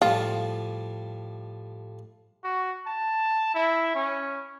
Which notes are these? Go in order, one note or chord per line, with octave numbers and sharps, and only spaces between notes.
A2 F3 G3 F4
F#4
A5
E4
C#4